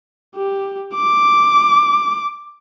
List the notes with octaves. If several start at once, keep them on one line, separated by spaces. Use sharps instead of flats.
G4
D6